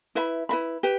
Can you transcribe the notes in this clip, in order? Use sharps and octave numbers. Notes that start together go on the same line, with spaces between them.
E4 B4 E5 B5
E4 B4 E5 B5
G4 B4